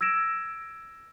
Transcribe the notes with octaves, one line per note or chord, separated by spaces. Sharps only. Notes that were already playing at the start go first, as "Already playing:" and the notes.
E6 G#6 A#6 D7 E7